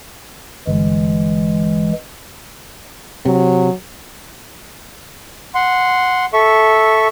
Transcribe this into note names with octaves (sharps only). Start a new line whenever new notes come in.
G1 E3 G#3
C3 F#3
F#5 C6
A4 E5 C#6